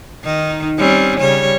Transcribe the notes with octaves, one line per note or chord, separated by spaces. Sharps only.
D#3 D#4
G3 C4 C#4
C#3 G3 C#5